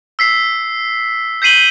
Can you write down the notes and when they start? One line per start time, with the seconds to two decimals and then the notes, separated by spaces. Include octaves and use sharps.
0.19 E6 B6 C7
1.42 G6 B6 C7 D#7 F#7 G7